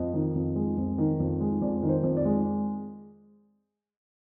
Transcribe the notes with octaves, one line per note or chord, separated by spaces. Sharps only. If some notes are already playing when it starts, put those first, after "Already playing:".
Already playing: F2 D#5
D#3
F2
G#3
F2
D#3
F2
G#3
F2 D5
D#3
C5
F2
D5
G#3